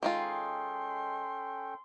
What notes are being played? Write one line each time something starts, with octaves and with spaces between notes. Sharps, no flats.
D#3 G#3 C#4 F4 A4 G5 C6